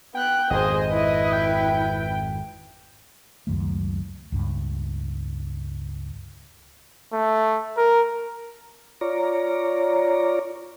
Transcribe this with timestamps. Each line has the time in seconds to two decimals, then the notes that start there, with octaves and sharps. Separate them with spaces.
0.15 B3 G5 F#6
0.50 G#1 F2 G#4 C5 D#5
0.91 E4 B4
1.33 G5
3.47 C#2 F#2 D#3 A3
4.32 C#2 G2
7.13 A3
7.77 A#4
9.01 F4 C#5 D5 A#5